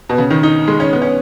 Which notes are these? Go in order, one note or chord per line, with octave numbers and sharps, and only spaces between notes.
B2
C#3
D#3
D#4
G#3
C#4
B3
C#4